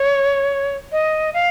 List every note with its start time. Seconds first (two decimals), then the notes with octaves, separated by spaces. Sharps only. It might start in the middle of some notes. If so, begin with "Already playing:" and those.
Already playing: C#5
0.92 D#5
1.34 F5